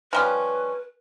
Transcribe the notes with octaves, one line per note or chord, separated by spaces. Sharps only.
F3 G3 C#4 B4